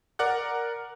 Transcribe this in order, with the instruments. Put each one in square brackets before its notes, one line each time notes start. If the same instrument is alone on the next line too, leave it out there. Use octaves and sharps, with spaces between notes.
[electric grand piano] A#4 D5 F#5 F#6